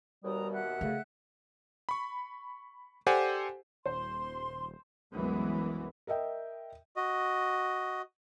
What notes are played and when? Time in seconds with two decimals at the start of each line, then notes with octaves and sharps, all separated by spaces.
0.24 D#2 B2 G3 A#5 D#6
0.51 E5 F#5 F#6
0.81 C#3 A3
1.89 B5 C#6
3.07 G4 A4 C5 D5 F#5 G#5
3.85 D#1 C5 C6
5.14 C2 F#2 E3 F#3 G#3 B3
6.07 A#4 D#5 E5 G5
6.96 F#4 D#5